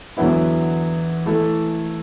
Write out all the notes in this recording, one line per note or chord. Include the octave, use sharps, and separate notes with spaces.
E2 D3 F#3 B3 E4
E3 A3 E4 A4